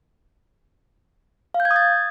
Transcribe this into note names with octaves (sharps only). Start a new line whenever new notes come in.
F5
G6
G#6
D#6
A6